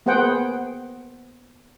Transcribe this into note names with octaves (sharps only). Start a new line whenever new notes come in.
A#3 B3 G#4 C5 F#5 G5